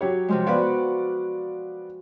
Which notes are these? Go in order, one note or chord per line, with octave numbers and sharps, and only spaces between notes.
F#3 G4 C#5
C3 F3 G#3
B3 F#4 D5 F5 B5